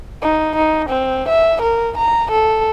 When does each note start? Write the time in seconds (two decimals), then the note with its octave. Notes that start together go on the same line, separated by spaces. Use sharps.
0.22 D#4
0.56 D#4
0.89 C4
1.29 E5
1.62 A#4
1.97 A#5
2.31 A4